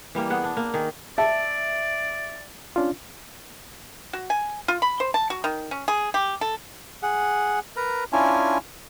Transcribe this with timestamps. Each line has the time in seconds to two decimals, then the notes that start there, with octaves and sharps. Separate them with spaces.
0.15 E3 G3 A#3
0.30 B3 G#4 F#5
0.44 D4
0.57 A#3
0.74 D#3 G#4
1.18 D5 E5 A5
2.76 C#4 D4 F4
4.13 F#4
4.30 G#5
4.68 F4
4.82 B5
5.00 C5
5.14 A5
5.30 F#4
5.44 D#3
5.71 C#4
5.88 G#4
6.14 G4
6.41 A4
7.03 G#4 F#5
7.77 A#4 B4 A#5
8.13 C#4 D4 E4 F4 G#5